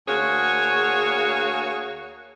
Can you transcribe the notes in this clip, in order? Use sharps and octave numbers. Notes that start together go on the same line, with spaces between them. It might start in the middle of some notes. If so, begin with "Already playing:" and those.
D2 A#3 F#4 G#4 C#5